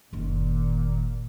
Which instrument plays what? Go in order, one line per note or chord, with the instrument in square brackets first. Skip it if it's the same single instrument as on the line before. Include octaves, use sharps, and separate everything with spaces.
[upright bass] F#1 D#3 [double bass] A#2